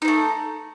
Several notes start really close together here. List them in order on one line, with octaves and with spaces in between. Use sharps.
D#4 C4 A3